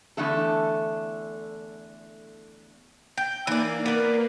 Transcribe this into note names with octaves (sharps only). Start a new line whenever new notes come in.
E2 D3 A3 A4
G5
E3 A#3 D4 D#4
B3 A#4 D5